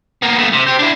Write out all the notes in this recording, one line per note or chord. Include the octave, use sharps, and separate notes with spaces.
A#3 B3
A3 B3
C3
G4 C5
D4 E4